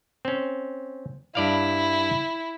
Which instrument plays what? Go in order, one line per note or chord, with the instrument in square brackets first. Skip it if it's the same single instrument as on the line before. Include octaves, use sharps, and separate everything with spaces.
[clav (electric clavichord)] C4 C#4
[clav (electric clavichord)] G2 D5 F5 [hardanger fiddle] E4